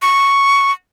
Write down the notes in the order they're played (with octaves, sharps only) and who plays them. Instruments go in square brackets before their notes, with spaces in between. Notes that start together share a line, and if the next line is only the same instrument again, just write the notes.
[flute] C#6